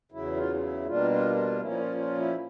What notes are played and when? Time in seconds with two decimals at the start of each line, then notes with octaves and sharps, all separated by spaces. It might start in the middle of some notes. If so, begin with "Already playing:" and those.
0.12 E2 C#3 F#3 E4
0.37 F4
0.56 F4
0.61 E4
0.86 B2 G3 A#3 D4 F4
1.11 F4
1.35 F4
1.60 A#2 F3 A#3 C#4 E4
1.72 E4
1.79 F4
1.97 F4
2.17 E4